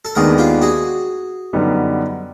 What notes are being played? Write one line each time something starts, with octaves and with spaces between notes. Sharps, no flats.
A4
D#2 D#3 G#3 B3 D4 G#4 A#4
F4 G4
F#4 G#4
F#2 D3 G3 B3 D#4